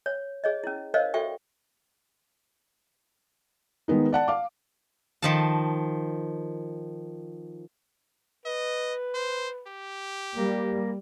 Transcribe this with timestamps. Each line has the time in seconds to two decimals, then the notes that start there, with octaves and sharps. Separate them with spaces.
0.06 C#5
0.44 G#4 C#5 D#5
0.64 C#4 E4
0.94 A#4 C5 C#5 D#5 F5
1.14 F#4 A4 E5 G5 C#6
3.88 D#3 G#3 B3 D#4
4.12 D5 F#5 A5
4.28 F5 D6
5.22 D#3 F3 A5
8.46 B4 D#5
9.15 C5
9.68 G4
10.35 G3 A#3